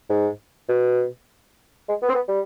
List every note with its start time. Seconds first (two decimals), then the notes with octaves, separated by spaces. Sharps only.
0.09 G#2
0.69 B2
1.89 G#3
2.02 B3
2.09 C4
2.15 B3
2.28 G3